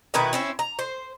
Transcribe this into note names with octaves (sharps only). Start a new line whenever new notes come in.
B2 D#3 E4 B4
C4 C#4 E4
A#5
C5